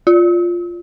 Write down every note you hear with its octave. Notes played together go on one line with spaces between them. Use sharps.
F4